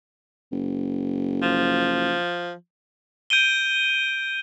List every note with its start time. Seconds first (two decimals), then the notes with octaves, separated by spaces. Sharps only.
0.52 F#1
1.42 F3
3.30 G6 D7 D#7 G7